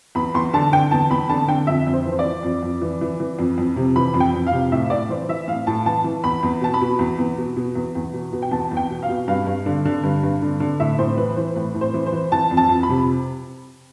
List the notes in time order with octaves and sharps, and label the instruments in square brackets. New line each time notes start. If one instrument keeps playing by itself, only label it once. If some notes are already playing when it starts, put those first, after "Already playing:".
[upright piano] E2 B5
E2 C6
D3 A5
D3 G5
E2 A5
E2 B5
D3 A5
D3 G5
F2 E5
F2
C5
E3
C5
D5
E3
F2
F2
E3
E3
E3
F2
F2
C3
E3 B5
F2
G5
F2
F5
C3
A2 E5
A2 D5
E3 C5
E3 E5
A2 F5
A2 A5
E3 A5
E3
E2 B5
E2
B2 A5
B5
B2
E2
E2
B2
B2
E2
E2
B2
B2
G5
E2 A5
E2
G5
B2
F5
B2
G2 F5
G2
D3
D3
G2
G2
D3
D3
A2 E5
A2 C5
E3 B4
E3 C5
A2 B4
A2
C5
E3
C5
E3
E3 A5
F2
A5
F2
B5
C3